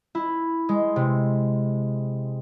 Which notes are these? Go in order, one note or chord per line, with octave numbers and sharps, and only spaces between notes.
E4
G#3
C3